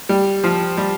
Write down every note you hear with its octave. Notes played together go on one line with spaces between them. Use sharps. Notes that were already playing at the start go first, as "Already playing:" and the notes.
G3
F3
G3